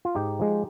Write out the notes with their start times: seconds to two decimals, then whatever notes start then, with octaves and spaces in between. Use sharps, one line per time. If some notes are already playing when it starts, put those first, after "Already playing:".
0.05 F4
0.15 G#2 D#4 G4
0.39 F3 G#3